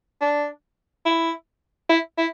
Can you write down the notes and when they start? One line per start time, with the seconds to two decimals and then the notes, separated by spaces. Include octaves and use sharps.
0.21 D4
1.05 E4
1.89 E4
2.18 E4